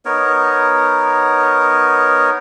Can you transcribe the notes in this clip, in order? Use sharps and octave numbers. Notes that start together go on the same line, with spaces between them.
B3 D#4 A#4 C#5